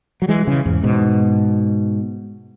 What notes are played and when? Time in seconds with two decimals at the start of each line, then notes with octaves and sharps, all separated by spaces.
0.22 F#3
0.28 E3 G#3
0.47 C#3 E3
0.66 E2 G#2
0.84 G#2 B2